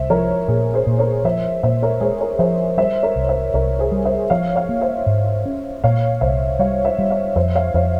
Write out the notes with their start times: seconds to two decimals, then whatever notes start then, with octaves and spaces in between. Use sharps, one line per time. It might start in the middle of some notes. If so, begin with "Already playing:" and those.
Already playing: C2 C5 E5
0.10 F3 A#4 C#5
0.48 A#2 G#4
0.73 G#4 C5
0.87 A#2
0.99 A#4 C#5
1.25 F3 C5 E5
1.63 A#2 C5 E5
1.82 A#4 C#5
2.01 G#3 G#4 C5
2.21 A#4 C#5
2.39 F3 C5 E5
2.77 G3 C5 E5
3.03 A#4 C#5
3.16 C2
3.29 C5 E5
3.54 C2 A#4 C#5
3.79 G#4 C5
3.92 G3
4.05 C5 E5
4.30 F3 C#5 F5
4.55 C#5 F5
4.69 A#3
4.81 C5 E5
5.06 G#2
5.46 C#4
5.84 A#2 C#5 F5
6.21 C2 C5 E5
6.59 G3 C#5 F5
6.85 C5 E5
6.99 G3
7.10 C#5 F5
7.36 F2 C5 E5
7.55 C#5 F5
7.74 F2 C5 E5